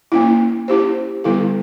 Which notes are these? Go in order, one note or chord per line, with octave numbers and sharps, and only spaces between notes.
A#3 C#4 E4
C#4 E4 G4 C5
D3 G3 B3 E4 A4